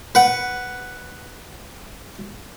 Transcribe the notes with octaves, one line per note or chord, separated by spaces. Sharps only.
B4 F#5